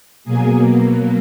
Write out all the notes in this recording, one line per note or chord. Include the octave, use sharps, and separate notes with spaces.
B2 F#3 A#3 G#4 G#5